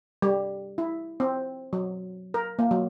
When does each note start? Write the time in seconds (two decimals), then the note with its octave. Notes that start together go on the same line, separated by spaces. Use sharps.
0.22 G3
0.78 E4
1.20 C4
1.73 F#3
2.34 A#4
2.59 A#3
2.71 F#3